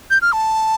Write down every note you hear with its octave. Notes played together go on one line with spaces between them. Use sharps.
G6
F6
A5